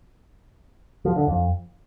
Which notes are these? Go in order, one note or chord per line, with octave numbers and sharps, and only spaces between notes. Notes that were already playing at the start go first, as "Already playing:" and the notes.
F3
D3
F2